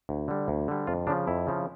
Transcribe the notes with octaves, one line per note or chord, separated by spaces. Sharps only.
D2
D3 G3
D2
D3 G3
F2 F4
C#3 F3 D4
F2 E4
C#3 F3